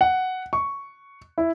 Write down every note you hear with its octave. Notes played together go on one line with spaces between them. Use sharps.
F#5
C#6
E4